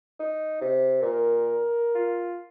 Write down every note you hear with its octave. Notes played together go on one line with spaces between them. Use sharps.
D#4
C3
A#2 A#4
F4